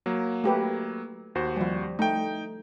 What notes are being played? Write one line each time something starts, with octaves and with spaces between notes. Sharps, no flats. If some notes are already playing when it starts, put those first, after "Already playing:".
F#3 A#3
A3 G4 B4
D#2 F#4 C5
F3 G3
A3 D#4 G5